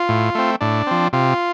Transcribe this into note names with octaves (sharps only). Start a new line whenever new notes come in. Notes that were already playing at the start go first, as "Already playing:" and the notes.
Already playing: F4
A2
A3 C4
A2 D4
F3 C4
C3 F4